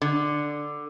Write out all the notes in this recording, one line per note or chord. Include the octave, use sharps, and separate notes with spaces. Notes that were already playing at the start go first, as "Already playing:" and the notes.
D3